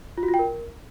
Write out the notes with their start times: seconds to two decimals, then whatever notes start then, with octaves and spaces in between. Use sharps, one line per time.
0.18 F4
0.23 F#4
0.28 F4
0.34 G5
0.39 A#4